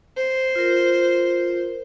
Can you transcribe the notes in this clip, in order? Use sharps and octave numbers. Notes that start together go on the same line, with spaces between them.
C5
F4 A#4